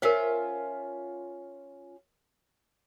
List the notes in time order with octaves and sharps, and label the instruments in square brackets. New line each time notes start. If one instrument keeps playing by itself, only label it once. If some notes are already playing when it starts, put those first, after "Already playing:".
[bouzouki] C#4 F4 E5 [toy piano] A#4 C5